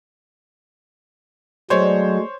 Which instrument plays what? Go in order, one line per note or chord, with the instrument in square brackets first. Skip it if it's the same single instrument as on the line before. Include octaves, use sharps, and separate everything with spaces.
[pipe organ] F#3 [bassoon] G#3 [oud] A3 D4 [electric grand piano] C5 C#5